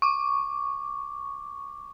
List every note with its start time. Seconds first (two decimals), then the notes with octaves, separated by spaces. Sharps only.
0.02 C#6 D6